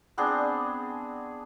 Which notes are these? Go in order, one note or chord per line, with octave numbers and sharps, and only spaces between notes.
B3 C4 D4 G#4